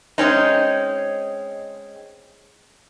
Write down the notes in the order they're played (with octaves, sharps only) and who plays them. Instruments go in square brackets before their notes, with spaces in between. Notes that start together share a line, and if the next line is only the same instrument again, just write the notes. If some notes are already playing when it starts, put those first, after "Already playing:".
[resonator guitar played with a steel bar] G#3 C4 C#4 D#4